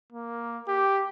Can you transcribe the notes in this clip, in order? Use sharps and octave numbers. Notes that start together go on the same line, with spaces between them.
A#3
G4